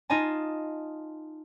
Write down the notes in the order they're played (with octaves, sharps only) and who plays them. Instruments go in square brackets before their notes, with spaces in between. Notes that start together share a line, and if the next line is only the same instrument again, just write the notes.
[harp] D#4 F4 D#5 G#5 A5